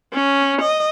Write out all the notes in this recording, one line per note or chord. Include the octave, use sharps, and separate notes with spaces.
C#4
D#5